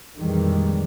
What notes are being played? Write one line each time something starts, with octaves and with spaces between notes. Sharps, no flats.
F2 A#2 D#3 E3 G3 G#3